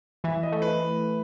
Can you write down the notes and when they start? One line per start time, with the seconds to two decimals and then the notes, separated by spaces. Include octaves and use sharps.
0.24 E3 E5
0.43 D#5
0.52 A3
0.62 B4